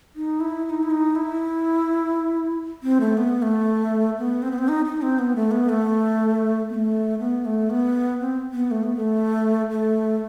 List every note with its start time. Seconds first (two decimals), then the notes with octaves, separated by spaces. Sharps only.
0.16 D#4
0.40 E4
0.65 E4
0.70 D#4
0.83 E4
0.90 D#4
1.16 E4
2.83 C4
3.01 A3
3.17 B3
3.42 A3
4.18 B3
4.42 C4
4.51 B3
4.58 C4
4.68 D#4
4.85 D#4
5.02 C4
5.19 B3
5.36 A3
5.51 B3
5.69 A3
6.70 B3
6.74 A3
7.19 B3
7.45 A3
7.70 B3
8.21 C4
8.54 B3
8.71 A3
8.83 B3
8.95 A3
9.71 A3